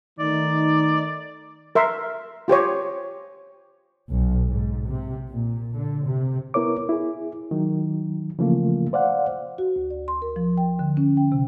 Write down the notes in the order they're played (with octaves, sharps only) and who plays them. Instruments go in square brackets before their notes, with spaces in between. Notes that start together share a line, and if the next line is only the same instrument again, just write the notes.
[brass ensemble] D#3 A3 D#4 [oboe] D5
[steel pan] A#4 E5 C6
F4 G4 C5 C#5
[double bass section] B1
G#2
C3
A#2
D3
C3
[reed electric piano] B3 E4 A#4 C#5 D6
E4 G#4
D#3 F#3
C#3 E3 F3 A3 A#3 F4
C5 D5 F5 F#5
[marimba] F#4
D2
D5
C6
A#4
F3
G5
D3
C#4
G5
C3